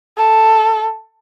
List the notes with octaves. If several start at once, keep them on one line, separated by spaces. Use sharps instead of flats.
A4